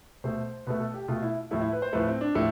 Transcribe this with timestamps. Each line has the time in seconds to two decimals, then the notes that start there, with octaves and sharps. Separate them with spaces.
0.24 B2 A3 C5
0.67 B2 A3 B4
0.80 A4
0.94 G4
1.08 B2 A3 F4
1.22 E4
1.51 A2 F3 A3 E4
1.61 E4
1.72 B4
1.82 C5
1.93 A2 F3 A3 B4
2.07 C4
2.21 D4
2.35 A2 F3 A3